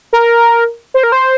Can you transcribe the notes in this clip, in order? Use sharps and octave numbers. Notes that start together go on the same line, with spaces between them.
A#4
C5
A#4
C5